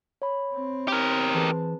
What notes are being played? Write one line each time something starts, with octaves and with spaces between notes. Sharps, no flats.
C#5 B5
C4
G4 A#4
E3 G#4 B4 A5